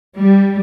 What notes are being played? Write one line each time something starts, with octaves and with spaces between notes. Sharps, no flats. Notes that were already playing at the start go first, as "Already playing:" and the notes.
G3